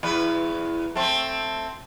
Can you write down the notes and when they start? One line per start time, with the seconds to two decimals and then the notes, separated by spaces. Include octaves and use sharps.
0.03 E2 B4
0.96 A3 C4